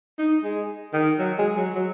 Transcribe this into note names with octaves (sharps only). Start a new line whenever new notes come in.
D#4
G#3
D#3
F#3
G#3
F#3
F#3